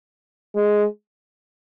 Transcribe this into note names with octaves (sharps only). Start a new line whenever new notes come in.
G#3